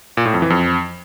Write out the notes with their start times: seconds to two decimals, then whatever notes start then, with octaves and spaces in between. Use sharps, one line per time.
0.17 A#2
0.25 A2
0.34 F2
0.42 E3
0.50 F2